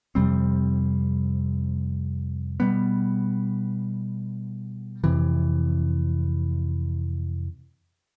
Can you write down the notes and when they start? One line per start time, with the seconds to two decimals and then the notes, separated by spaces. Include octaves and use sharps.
0.15 F2 C3 G3 C4
2.60 B2 G3 B3
5.04 F2 C3 E3